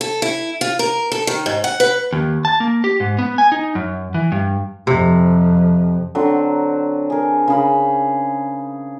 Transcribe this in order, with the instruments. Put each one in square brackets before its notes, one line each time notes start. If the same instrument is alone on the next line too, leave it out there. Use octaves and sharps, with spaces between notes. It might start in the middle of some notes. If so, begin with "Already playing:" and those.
[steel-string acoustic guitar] A4
E4
F4
A#4
A4
D#3
G#2
F#5
B4
[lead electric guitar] D#2
A5
A#3
G4
G#2
B3
G#5
D#4
F#2
E3
G2
[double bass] F2 [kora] C3
[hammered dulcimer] D3 F#3 C4
G#4 A#4
C#3 G#4 B5